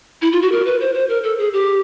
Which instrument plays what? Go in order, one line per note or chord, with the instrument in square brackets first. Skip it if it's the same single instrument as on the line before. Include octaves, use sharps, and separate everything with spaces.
[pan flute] E4
F4
F#4
A#4
B4
C5
C5
A#4
A4
G#4
G4